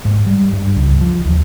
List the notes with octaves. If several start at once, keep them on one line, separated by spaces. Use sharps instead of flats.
G#2
G3
G2
C#2
F3
D#2